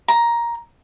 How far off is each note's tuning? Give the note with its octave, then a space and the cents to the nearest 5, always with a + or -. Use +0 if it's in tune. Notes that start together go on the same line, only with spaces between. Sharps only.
A#5 +10